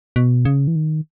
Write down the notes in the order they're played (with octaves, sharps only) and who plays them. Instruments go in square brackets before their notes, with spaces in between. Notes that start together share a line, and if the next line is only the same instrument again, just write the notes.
[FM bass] B2
C#3
E3
D#3